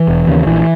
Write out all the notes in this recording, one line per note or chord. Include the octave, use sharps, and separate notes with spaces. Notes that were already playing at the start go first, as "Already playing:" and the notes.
Already playing: E3
E1
D#2 C#3
A#1 E3